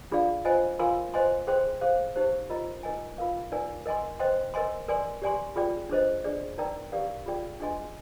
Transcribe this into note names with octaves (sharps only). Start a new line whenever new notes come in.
D4 F4 G#4 D5 F5
F4 C5 D#5 G#5
F4 A#4 F5 G#5 C6
C5 D#5 G#5 C6
G#4 C5 G5 C6
G#4 C5 F5
D#4 G4 C5
F4 A#4 D#5 A#5
D#4 A#4 D#5 G#5
F4 A#4 F5
D#4 A#4 D5 G#5
A#4 D#5 G#5 C6
C5 D#5 G5 C6
A#4 D#5 G#5 C6
A#4 D5 G#5 C6
G4 D5 G#5 C6
F4 G#4 D5 G5
D4 G#4 C5 D#5
D4 G#4 D5
D#4 A#4 D5 G5 A#5
G4 A#4 D5 F5
F4 G#4 D5 G5
D4 G#4 D#5 G#5 C6